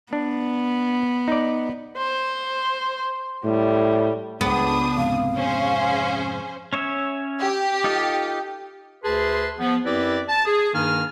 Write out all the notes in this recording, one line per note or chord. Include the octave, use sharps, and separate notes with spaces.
B3 D4
D#4 D5
C5
A2 G3
C#2 B3 D4 G#4 G5 D#6
F2 G#2 C3 F5
C#4 G#4 C5
C#4 C#5 E5
G4
D#4 F4 A4
D2 G#4 B4 A5 C6
F3 B3
F#2 C4 E4 G4 B4 D5
A5
G#4
G2 D#3 A#3 D#4 G#5 F6